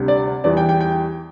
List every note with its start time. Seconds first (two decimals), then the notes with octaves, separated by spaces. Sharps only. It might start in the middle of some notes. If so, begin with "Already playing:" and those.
Already playing: D2 C3 G3
0.08 D5
0.44 E2 E3 G3 D5
0.57 G5
0.69 G5
0.81 G5